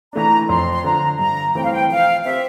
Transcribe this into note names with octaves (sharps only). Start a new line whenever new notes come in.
E3 A3 D4 A#5
F2 C6
C6
D3 F3 A#5
G2 A#5
E3 A3 C4 G5
F5
G5
F3 F5
C4 G4 C5 E5